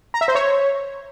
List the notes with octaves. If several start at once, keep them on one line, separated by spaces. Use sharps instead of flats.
A#5
E5
C5
C#5